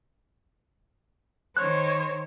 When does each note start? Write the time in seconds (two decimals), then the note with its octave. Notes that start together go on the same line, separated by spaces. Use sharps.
1.57 D#3 C5 C#5 F#6